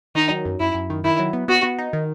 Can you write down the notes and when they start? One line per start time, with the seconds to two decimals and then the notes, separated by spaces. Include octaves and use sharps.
0.15 D#3 D#4
0.30 F#3
0.45 F#2
0.60 F#2 E4
0.74 F#2
0.90 D#3
1.04 D#3 E4
1.19 F#3
1.33 B3
1.48 B3 F#4
1.63 B3
1.78 D#4
1.93 D#3